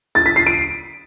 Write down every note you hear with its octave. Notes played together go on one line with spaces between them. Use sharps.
A6
B6
C7
D7